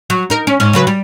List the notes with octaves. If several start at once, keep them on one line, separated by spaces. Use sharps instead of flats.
F#3
D#4 A#4
C#4
G#2 C#4
C#3 F#3 B4
G3